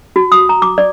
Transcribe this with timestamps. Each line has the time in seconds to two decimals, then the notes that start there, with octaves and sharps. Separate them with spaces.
0.16 F#4
0.32 D#6
0.49 A#5
0.62 D6
0.78 D5